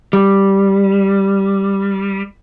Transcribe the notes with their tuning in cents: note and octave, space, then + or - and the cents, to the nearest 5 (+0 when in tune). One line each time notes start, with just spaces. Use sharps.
G3 +0